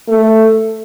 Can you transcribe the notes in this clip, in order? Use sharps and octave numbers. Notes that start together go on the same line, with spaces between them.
A3